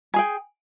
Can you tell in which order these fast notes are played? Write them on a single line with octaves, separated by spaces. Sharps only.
G#5 G#4 G5